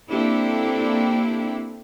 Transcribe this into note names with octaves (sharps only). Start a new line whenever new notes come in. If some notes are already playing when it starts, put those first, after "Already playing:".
A#3 C4 D4 E4 G4 A4